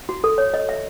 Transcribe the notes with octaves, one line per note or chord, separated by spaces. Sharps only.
F#4
A4
C#5
D#5
E5